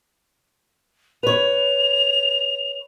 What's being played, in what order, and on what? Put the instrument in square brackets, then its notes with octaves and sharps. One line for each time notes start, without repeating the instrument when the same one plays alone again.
[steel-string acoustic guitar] B4 C#5 [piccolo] F7